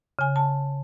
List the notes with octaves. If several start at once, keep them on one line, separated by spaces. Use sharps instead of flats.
C#3 G#5
A5